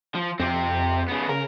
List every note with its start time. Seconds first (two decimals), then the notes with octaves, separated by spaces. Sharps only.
0.15 F3
0.40 F2 C4 G4
1.08 C#3 B3
1.29 C#3 A#4